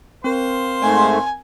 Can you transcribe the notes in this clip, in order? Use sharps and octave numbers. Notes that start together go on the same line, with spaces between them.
C4 A#4 C5 F5 C6
G#2 A3 G#5